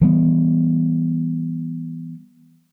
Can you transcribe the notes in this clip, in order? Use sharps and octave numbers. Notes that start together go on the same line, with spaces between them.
E3 G3 B3